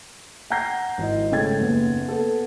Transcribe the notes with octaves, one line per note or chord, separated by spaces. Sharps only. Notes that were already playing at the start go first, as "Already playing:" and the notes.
F#5 G5 A#5 G6 A#6 C7
G#1 E4 D#5
C#3 G#3 A3 G5 G#6 A6
F#1 D#2 B3
B3 A4